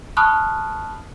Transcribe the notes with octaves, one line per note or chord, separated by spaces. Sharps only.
A5 B5 C#6 D#6 F6 F#6